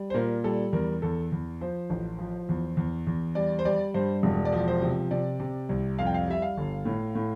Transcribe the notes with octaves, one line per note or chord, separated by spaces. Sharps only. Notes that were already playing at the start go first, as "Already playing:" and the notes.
Already playing: G3
C5
A#2 A#4
G3 A4
E2 A#4
E2 A4
E2
F3 C5
A1
F3
E2
E2
E2
G3 D5
C5
G3 D5
G2 C5
E1
D5
F3
C5
C3
C3 D5
C3
C2
F2 F5
G5
F5
G3 E5
F5
G1
A2
A2